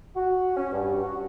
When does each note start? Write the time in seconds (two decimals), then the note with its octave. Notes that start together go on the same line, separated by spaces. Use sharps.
0.16 F#4
0.56 C#4
0.72 G2
1.03 F#4